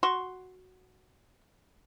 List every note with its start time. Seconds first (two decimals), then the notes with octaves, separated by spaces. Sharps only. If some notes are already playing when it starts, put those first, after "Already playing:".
0.03 F#4 C6 C#6